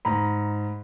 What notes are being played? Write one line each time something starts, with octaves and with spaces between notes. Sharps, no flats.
G#2 A#5 B5